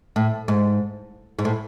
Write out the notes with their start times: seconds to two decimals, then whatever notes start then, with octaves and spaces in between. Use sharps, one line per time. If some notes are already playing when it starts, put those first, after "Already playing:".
0.16 A2
0.48 G#2
1.39 G#2
1.45 A2